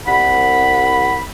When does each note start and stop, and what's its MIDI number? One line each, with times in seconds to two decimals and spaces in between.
0.06 1.24 36
0.06 1.13 78
0.06 1.24 83